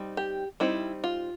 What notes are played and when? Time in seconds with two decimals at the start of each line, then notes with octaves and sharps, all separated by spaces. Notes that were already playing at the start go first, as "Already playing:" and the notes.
Already playing: G3 C4 D#4
0.17 G4
0.60 G3 C4 D#4 E4
1.04 F4